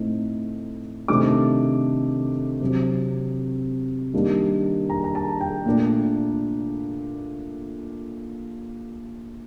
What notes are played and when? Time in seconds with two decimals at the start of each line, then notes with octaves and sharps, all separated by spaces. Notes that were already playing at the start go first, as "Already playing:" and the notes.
Already playing: A2 A3 C4 D#4
1.08 C3 D#3 A3 D4 D6
2.61 C3 F#3 C4
4.14 D#3 G3 A#3 D4
4.90 A#5
5.04 A#5
5.15 A5
5.41 G5
5.66 A#2 A3 D4